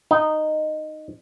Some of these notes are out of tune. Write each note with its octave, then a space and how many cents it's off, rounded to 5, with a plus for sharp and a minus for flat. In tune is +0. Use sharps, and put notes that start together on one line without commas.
D#4 -10